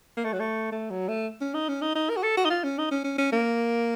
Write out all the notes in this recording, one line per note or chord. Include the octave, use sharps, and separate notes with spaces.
A#3
A3
F#3
A3
A3
F#3
A3
C#4
D#4
C#4
D#4
D#4
A#4
F#4
A4
F#4
D#4
F4
C#4
D#4
C#4
C#4
C#4
A#3